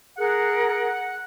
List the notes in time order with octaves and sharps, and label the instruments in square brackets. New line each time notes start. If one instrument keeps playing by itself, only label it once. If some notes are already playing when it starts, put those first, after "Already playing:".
[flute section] G#4 A#4 [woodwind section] F#5